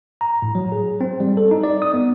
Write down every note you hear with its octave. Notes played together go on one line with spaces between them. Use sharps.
A#5
A2
F#3
G#4
C4
G3
A4
D#4
D5
D#6
B3